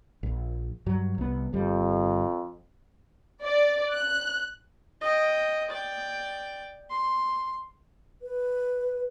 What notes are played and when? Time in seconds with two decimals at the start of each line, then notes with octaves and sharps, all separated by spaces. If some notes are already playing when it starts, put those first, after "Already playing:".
0.23 A#1
0.86 G2 F#3
1.18 C2 B3
1.53 G1 F2 G3
3.43 D5
3.94 F#6
5.01 D#5 G5
5.70 D5 G5
6.90 C6
8.22 B4